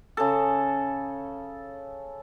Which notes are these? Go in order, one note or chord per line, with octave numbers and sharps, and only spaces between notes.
C#3 A4